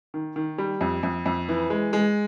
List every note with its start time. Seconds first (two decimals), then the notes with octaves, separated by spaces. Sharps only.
0.14 D#3
0.36 D#3
0.58 G3
0.81 F2
1.03 F2
1.26 F2
1.49 E3
1.70 G#3
1.93 G#3